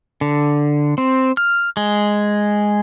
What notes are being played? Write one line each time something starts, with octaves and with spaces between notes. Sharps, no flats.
D3
C4
F6
G#3